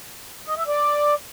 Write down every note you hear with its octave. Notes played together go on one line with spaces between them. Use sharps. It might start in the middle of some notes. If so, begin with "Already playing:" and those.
D#5
E5
D5